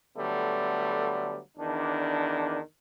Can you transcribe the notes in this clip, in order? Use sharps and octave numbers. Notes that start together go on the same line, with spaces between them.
D3 F#3 G3 A3 B3
E2 D#3 D4